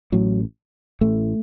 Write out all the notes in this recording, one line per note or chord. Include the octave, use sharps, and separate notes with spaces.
A1 A2 F#3
A1 A2 A3